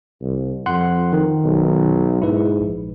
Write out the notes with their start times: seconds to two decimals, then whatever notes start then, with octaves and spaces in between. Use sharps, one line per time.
0.22 C2
0.66 F2 F#5 C6 F#6
1.13 D#3
1.44 B1
2.22 G#2 E4 B4
2.60 A#1